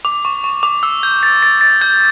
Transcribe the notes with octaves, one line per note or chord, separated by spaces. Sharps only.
D6
C#6
C#6
D6
E6
G6
A6
A6
A6
G6